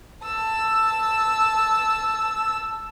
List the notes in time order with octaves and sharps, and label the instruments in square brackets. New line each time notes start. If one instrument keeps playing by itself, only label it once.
[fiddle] A5 E6